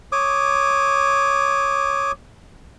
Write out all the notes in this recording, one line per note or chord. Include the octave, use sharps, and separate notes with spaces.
C#5 D6 D#6